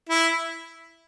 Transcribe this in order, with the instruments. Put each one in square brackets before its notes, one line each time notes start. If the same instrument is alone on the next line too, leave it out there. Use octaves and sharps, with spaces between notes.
[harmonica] E4